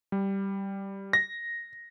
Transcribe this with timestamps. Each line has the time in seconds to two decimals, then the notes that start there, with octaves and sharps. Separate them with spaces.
0.12 G3
1.13 A#6